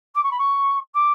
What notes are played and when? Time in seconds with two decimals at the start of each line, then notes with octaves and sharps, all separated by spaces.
0.14 D6
0.23 C#6
0.31 B5
0.38 C#6
0.94 D6